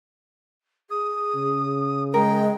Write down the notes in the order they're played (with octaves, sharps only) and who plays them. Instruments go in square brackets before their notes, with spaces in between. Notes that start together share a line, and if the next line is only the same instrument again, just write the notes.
[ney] G#4 [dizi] D#6
[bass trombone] C#3
[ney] G#3 [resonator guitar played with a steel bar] A#4 [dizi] G5